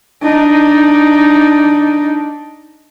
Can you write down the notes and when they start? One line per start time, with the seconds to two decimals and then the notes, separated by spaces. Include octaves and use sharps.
0.23 D4 D#4